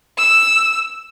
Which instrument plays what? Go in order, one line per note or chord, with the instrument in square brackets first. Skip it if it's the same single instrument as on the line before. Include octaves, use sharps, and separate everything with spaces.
[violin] E6